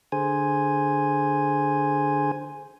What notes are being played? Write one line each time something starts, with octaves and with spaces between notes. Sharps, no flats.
D3 G#4 C5 G#5